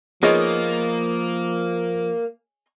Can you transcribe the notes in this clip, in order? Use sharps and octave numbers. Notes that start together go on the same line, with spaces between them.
F3 A#3 B3 D#4 F4 G#4 C#5 D#5